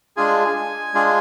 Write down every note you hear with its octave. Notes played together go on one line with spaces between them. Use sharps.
G#3 D4 F4 G#4 G#5
G#3 D4 F4 G#4